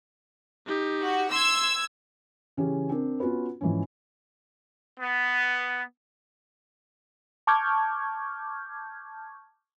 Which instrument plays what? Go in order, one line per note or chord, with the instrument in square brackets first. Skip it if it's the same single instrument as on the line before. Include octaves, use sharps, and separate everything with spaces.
[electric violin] D#4 G4
[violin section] F#4
[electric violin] C6 [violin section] E6 G#6
[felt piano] C#3 E3 C#4 G4
C4 D4 A#4
B3 C#4 F4 F#4 B4
G#2 E3 F3 C#4
[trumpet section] B3
[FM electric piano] A5 C#6 D6 F6 G6 G#6